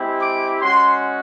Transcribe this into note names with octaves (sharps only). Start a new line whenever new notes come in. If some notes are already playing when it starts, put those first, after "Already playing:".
Already playing: G#3 C4 E4 G4
D6
G#3 C#4 F#4 C6